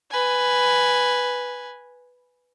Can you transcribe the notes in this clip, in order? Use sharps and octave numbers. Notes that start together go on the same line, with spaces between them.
B4 G#5